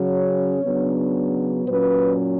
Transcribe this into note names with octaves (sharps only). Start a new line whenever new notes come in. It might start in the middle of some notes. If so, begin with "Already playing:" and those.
Already playing: C#3 F#3 C#4 C#5
C#3 F#3 B3 D4
A#2 F#3 C#4 B4